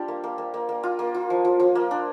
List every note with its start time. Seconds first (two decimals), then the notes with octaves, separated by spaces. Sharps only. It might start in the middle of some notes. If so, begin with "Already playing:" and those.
Already playing: G3 D4 F4 G4 C5 D5
0.08 A#3
0.24 A#3
0.38 A#3
0.54 A#3
0.69 A#3
0.83 F4
0.99 A#3
1.14 F4
1.30 F3
1.45 F3
1.60 F3
1.75 A#3
1.91 D4